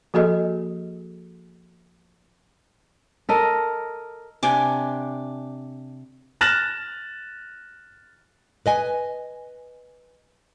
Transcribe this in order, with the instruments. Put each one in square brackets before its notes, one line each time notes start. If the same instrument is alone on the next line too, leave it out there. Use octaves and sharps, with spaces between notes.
[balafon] F3 A#3 F#4 G#4 A4 D#5
[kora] A4 A#4 D#5
[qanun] C3 D4 D6 [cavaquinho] D5 G#5
[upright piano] F6 F#6 A6 A#6 E7 F#7
[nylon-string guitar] B4 D#5 G#5